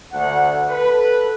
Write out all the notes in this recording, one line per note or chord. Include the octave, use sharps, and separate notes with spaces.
D2 F#5
A4 B4